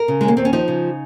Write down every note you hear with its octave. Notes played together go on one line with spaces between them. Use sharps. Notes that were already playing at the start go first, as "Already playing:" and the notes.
Already playing: A#4
C#3
D#2 G#3
A#3
D#2 C4
C#4
F3 D#4
C#3